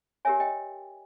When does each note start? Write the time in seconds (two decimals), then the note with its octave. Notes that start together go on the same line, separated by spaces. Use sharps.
0.25 G4 A#4 C#5 E5 G#5
0.40 D#5 G5